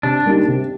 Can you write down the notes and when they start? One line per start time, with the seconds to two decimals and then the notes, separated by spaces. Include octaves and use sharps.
0.03 C3 D4
0.26 G3 A#3 D#4 G4
0.48 C3